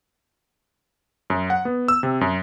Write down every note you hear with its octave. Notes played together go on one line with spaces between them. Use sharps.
F#2
F#5
B3
E6
C3
F#2